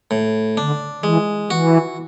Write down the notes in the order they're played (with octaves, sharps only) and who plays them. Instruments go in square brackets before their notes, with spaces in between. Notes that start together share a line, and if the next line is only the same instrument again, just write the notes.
[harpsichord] A2
[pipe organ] D3 [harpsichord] D4
[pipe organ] E3 [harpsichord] G#3
[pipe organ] E3 [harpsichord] F#4